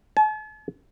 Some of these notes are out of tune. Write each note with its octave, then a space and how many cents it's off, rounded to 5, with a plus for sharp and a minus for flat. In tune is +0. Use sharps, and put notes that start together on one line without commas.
A5 -45